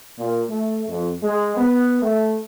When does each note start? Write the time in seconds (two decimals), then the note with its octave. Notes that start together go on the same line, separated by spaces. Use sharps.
0.18 A#2
0.48 A3
0.88 F2
1.23 G#3
1.57 B3
2.02 A3